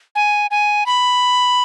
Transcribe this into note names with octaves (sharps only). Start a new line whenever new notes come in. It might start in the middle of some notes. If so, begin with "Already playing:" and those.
G#5
G#5
B5